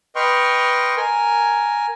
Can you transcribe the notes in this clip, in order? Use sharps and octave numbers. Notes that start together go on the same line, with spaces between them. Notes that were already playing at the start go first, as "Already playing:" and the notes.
B4 D#5 G5 C6 C#6 F6
A#4 G#5